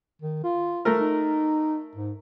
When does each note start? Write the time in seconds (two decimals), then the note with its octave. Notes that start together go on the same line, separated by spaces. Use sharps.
0.22 D#3
0.43 F4
0.85 A3 A#4
0.99 D#4
1.96 G#2